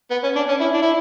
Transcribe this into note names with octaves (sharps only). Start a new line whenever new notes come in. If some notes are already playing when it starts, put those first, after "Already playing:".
B3
C#4
D4
C#4
E4
D4
E4